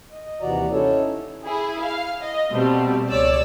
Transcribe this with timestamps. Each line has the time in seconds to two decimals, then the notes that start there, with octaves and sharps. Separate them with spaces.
0.12 D#5
0.41 D#2 C3 E3 F#4 D5 A#5
0.72 C#4 D#4 E4 A4 C#5
1.43 E4 G#4
1.81 F5
2.22 D#5
2.52 B2 G3 A3 C4
3.11 C#2 C#5 D5 E6